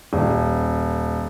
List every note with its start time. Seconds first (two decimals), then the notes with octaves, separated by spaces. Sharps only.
0.13 D#1